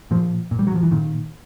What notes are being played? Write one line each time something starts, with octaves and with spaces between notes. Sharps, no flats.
A#2 F3
A#2
G3
F#3
F3
E3
A#2 D#3